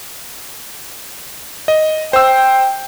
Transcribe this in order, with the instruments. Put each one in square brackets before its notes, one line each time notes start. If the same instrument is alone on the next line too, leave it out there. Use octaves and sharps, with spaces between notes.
[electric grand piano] D#5
[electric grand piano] C5 E6 [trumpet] G5